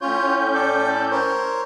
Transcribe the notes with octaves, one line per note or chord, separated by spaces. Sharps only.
A2 C#4 F4 C#5 G6
A4 D5
A#4 C5 C#5